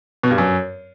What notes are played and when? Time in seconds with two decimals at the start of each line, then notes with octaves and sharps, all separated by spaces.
0.23 B2
0.31 G2
0.38 F#2